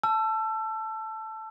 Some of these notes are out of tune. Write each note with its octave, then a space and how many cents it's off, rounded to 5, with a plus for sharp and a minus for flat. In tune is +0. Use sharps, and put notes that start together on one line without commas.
A5 +0 E6 +30